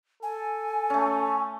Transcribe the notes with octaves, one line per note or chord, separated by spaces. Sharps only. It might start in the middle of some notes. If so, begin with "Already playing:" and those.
A4 G#5
A3 C#4